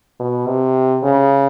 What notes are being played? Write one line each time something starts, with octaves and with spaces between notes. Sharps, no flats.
B2
C3
C#3